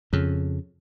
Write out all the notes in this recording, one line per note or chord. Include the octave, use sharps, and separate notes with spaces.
F2 C#3